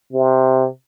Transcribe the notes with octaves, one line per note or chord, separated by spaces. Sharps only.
C3